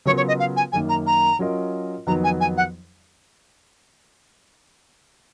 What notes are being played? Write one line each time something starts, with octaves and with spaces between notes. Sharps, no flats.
C#3 F#3 B3 F4 A#4 C#5
C#5
D#5
F5
G#5
F#2 D#3 A#3 G#5
A#5
A#5
F#3 C#4 F4 A#4 D#5
F2 D#3 F#3 B3 D#4 A#5
G#5
G#5
F#5